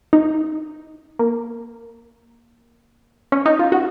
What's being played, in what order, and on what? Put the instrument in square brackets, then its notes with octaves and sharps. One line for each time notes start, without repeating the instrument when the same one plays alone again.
[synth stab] D#4
A#3
C#4
D#4
F4
F#4